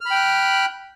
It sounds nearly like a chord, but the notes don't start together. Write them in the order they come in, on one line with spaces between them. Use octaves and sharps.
F6 B5 G5 F#6